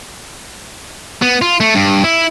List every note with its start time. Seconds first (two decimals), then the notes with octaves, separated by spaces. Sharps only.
1.22 B3
1.42 F4
1.60 A3
1.75 G2
2.04 E4